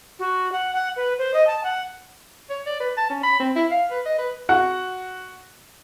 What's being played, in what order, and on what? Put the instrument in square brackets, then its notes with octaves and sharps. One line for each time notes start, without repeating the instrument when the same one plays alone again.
[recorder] F#4
F#5
F#5
B4
C5
D#5
A5
F#5
[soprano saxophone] C#5
D5
B4
A5
C#4
B5
C4
E4
F5
B4
D#5
B4
[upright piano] F#4 F#5